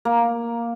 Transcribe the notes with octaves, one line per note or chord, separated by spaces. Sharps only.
A#3